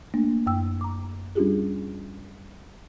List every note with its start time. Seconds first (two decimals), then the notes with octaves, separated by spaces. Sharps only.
0.14 A3 A#3 D4
0.46 F#2 G5 E6
0.81 A#5 D6
1.35 G3 C#4 D4 F4 G4 G#4